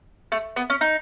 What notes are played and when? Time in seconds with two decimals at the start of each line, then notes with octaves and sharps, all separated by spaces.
0.32 A3
0.56 B3
0.70 C#4
0.81 D#4